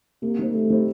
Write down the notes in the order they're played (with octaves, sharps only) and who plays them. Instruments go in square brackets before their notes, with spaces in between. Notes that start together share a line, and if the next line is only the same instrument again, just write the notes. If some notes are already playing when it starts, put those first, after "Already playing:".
[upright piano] C3 [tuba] A#3
[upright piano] D#3 G3 C4
[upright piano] C3 [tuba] A3
[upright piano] D#3 G3 C4